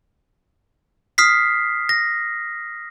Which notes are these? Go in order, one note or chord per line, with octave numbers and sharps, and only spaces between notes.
D#6 F6 B6 C7
A#6